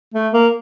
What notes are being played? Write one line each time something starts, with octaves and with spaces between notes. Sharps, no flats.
A3
A#3